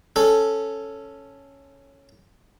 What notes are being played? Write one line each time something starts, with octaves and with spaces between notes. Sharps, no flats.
C#4 A4